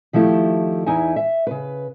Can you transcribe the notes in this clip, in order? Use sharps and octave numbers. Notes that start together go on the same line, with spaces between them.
D#3 F3 A3 E4 G4
E2 D#4 E4 E5 G#5
E5
C#3 B4